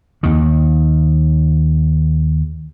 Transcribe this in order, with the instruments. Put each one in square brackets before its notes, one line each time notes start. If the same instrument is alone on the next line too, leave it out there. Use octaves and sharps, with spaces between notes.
[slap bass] D#2 D#3